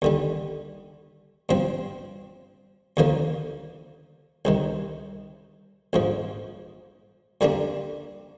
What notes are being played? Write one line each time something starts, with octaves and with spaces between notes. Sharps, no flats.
D#2 D3 G3
G2 F3 C4
D#2 D3 F3 A#3
C2 C3 D#3
A#1 G#2 F3
F2 D3 G3 A#3 D4